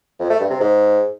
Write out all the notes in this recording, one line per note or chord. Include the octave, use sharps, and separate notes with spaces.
F2
A3
G2
C3
G#2